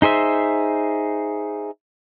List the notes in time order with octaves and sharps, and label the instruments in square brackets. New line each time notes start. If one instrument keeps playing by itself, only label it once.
[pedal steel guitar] D#4 G#4 C5 E5